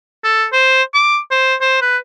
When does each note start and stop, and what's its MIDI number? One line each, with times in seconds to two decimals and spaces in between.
0.24 0.45 69
0.53 0.82 72
0.94 1.18 86
1.31 1.55 72
1.61 1.81 72
1.82 1.97 71